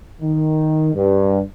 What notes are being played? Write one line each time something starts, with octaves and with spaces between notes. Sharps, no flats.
D#3
G2